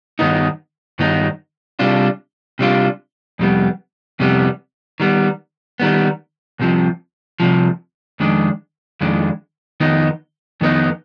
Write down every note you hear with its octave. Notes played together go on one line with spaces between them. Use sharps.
G2 D#3 B3 D#4
G2 D#3 B3 D#4
C3 G3 D4 F4
C3 G3 D4 F4
F2 C3 G3 B3
F2 C3 G3 B3
D#3 G3 B3
D#3 G3 B3
C2 C3 F3
C2 C3 F3
F2 D#3 G#3 D4
F2 D#3 G#3 D4
F2 D#3 B3 D#4
F2 D#3 B3 D#4